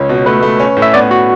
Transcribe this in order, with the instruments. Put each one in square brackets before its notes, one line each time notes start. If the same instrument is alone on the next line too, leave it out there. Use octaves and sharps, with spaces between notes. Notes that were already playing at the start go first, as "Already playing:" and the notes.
Already playing: [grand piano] C#2 [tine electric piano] C#5
[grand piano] B2
[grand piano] A3 [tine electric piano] B4
[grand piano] A3
C#4
A2
[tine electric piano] E5
[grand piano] B3 [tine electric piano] D5
[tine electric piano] F#4